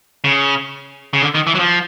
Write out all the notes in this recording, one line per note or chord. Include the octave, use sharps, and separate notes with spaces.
C#3
C#3
D3
D#3
E3
F#3
F3